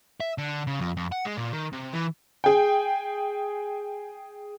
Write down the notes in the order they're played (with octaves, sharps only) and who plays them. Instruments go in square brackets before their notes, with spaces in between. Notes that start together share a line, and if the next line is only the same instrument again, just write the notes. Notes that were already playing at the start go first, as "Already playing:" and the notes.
[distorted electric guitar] E5
D3
C#3
F2
F2
F#5
G#3
A#2
D#3
C3
E3
[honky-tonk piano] G#4 G5